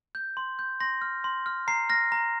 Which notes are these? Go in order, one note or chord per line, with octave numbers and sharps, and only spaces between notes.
G6
C6
G6
C6 A#6
F6
C6
F6
A#5 C7
F6 A#6
A#5